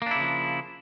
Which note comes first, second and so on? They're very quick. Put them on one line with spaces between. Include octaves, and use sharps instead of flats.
A#3 D4 E4 C#3 F3